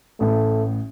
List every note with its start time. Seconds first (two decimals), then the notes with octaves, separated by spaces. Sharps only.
0.20 A1 A2 A3